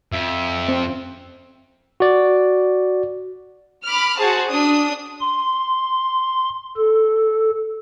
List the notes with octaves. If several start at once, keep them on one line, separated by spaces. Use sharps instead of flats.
F2 E5
C4
F#4 D5
B5 D6 F6
F#4 G#4 C5 A5
D4 D#6
C6
A4